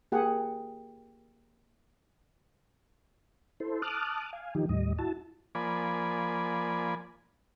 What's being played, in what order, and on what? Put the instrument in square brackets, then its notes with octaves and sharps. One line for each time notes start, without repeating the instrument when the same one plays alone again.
[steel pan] A#3 G4 G#4 F#5
[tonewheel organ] E4 A4 C5
A5 D6 D#6 F6 F#6
F5 G#5
D#3 F3 D#4 G4
D#2 A2 G3 D#5
E4 F#4 A5
[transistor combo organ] F3 A#3 D5 G#5 B5